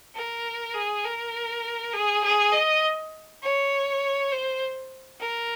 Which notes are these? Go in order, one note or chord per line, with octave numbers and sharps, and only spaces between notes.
A#4
G#4
A#4
G#4
G#4
D#5
C#5
C5
A#4